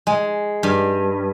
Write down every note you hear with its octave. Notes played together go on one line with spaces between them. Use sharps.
G#3
G2